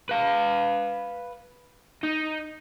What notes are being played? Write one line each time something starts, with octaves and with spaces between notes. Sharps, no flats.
B4 F5
D#4